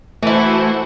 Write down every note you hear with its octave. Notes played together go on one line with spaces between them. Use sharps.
E3 A3 E4 F#4 C5 F#5